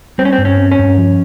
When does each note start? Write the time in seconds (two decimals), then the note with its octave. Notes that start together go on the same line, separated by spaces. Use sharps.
0.18 G3 C4
0.25 C#4
0.33 C4
0.38 G2
0.45 C#4
0.58 C4
0.72 C#4
0.79 G2
0.98 F3